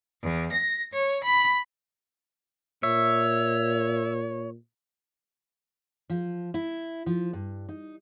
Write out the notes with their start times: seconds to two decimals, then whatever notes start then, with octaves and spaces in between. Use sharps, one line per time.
0.22 E2
0.51 A#6
0.92 C#5
1.24 B5
2.83 A#2 C#5 E5
6.10 F3
6.54 E4
7.06 F3
7.33 G2
7.69 D#4